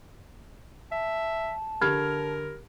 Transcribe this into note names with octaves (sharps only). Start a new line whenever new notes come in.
E5 A5
D3 G4 A#4 B5 F6 G#6